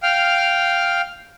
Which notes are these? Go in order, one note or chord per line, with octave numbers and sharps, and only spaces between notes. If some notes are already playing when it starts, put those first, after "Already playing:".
F5 G5 F6